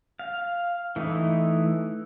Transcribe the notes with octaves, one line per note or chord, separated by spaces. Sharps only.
F5
E3 A3 D#4